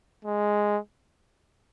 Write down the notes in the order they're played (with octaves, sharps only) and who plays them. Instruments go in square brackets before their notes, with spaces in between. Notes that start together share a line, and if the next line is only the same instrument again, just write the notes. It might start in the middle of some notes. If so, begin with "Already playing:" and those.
[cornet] G#3